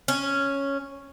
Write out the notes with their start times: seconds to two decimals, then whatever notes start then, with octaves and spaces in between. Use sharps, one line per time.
0.08 C#4